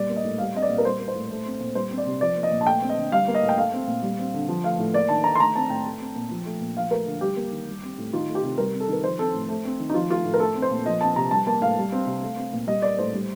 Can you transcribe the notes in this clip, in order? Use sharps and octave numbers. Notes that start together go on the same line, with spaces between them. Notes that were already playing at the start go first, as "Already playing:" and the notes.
Already playing: A#2 G3 D5
A#3
D#5
A2
G3 F5
C4 D#5
D5
A#2
A#4
G3 C5
A#3
C5
A2
A3
C4
A#2
G3 C5
C4
D5
C3
F3 D5
A#3
D#5
A#2
A5
A3 G5
C4
D#5
D3
G3 F5
A#3
D#5
A2
G5
A3 F5
C4
A#2
G3
C4
D3
F3
A3 F5
A2
A#3 D5
D#3 A5
D#3 A#5
C6
A3 A#5
C4 A5
A2 G5
A3
C4
A#2
F3
A3
A#2
F3 F5
A3 A#4
D3
G3 G4
A#3
D#3
G3
C4
A2
D#3 F4
A3
G4
C3
G3 A#4
C4
A4
D#3 A#4
F3 C5
C4 A4
A2
A3
C4
D#3
D#4
F3 F4
A3 F4
A2
A#4
A3 A4
C4
C5
A#2
F3 D#5
C4 A5
C3 A#5
G3 A5
A#3 A5
A2 F5
G3
C4
C3
A3
C4
A#2
G3 D#5
A#3 D5
A2 C5
G3